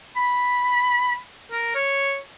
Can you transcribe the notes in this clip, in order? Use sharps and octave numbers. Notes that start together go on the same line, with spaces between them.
B5
A#4
C#5